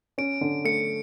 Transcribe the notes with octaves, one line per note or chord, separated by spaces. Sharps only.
C#4 D7
D3
A3 C#7